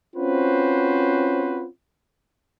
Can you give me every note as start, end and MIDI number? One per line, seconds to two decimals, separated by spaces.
0.16 1.66 60
0.16 1.66 61
0.16 1.66 65
0.16 1.66 66
0.16 1.66 71
0.16 1.66 72